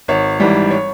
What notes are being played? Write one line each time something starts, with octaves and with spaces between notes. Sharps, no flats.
G#1 C#5
G#2 E3 G3
C#5